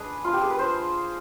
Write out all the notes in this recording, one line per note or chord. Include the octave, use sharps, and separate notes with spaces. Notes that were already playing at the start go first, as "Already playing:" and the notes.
Already playing: G#3 D4 G#4 B4
F4
G4
G#4
B4
C5